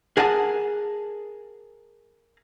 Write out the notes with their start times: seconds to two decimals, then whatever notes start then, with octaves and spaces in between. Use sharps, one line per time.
0.17 G#4 A#4 F#5 G#5 A5